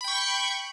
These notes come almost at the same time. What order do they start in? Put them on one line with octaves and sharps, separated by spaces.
B5 G5 C#6 G6